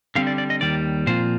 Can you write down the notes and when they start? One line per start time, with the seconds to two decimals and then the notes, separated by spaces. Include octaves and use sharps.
0.15 D3 G3 C4 F5
0.27 D5
0.38 D5
0.50 D#5
0.61 D#2 D#3 G3 D5
1.07 A#2 F3 C4 F4 C5